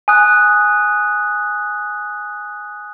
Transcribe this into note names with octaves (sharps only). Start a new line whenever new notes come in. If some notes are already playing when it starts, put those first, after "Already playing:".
G#5 D#6 F#6